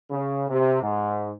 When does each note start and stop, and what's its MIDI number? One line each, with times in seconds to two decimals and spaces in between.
0.10 0.48 49
0.50 0.82 48
0.82 1.31 44